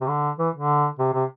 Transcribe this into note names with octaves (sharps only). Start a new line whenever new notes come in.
C3
D3
E3
D3
C3
C3